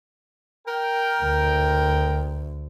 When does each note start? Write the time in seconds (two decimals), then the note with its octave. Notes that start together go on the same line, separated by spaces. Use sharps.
0.67 A#4 G5
1.23 D2